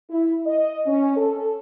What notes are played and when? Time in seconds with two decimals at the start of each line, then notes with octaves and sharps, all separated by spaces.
0.10 E4
0.46 D#5
0.87 C#4
1.17 A4